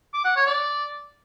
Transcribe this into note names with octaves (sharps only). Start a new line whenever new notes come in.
D6
F#5
C#5
D5